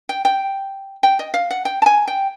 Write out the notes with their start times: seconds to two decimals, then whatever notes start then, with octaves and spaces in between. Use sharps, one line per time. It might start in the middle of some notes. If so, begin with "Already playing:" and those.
0.09 G5
0.25 G5
1.03 G5
1.19 D#5
1.34 F5
1.51 F#5
1.65 G5
1.82 A5
1.86 G#5
2.08 G5